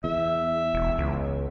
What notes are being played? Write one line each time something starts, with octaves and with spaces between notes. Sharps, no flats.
E2 E5
E1
C#2